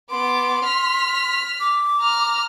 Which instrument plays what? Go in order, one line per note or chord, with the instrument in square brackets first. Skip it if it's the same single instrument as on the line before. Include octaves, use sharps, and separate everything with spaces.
[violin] B3 D6 [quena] C6
[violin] F6 B6
[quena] D6
[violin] A#5 F6